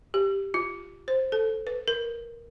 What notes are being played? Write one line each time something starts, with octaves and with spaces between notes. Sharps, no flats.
G4
F4
C5
A4
B4
A#4